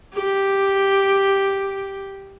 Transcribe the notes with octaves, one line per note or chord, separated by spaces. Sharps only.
G4